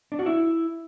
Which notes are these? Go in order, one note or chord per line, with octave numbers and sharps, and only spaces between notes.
D4
F#4
E4